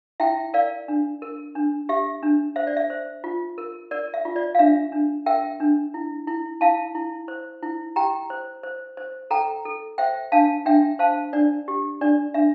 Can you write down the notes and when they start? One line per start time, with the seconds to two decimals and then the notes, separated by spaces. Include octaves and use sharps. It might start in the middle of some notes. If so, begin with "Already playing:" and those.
0.20 E4 E5 G5
0.54 A#4 D5 F5
0.88 D4
1.22 A#4
1.55 D4
1.89 G4 E5
2.23 D4
2.56 C5 E5
2.67 D5
2.77 E5
2.90 C5
3.24 F4
3.58 A#4
3.91 A#4 D5
4.14 E5
4.25 F4
4.36 D5
4.55 F5
4.59 D4 E5
4.92 D4
5.26 A#4 E5 G5
5.60 D4
5.94 E4
6.27 E4
6.61 E4 F5 A5
6.95 E4
7.28 C5
7.63 E4
7.96 G4 G5 A#5
8.30 C5
8.63 C5
8.97 C5
9.31 A4 G5 A#5
9.65 A4
9.98 C5 E5 G5
10.32 D4 F5 A5
10.66 D4 E5 G5
10.99 C5 F5 A5
11.33 D4 D5
11.68 G4
12.01 D4 D5
12.34 D4 E5